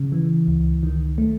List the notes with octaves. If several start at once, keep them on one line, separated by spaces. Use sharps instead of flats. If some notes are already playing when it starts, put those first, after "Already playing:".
Already playing: C#3
E3
C#2
D#3
A3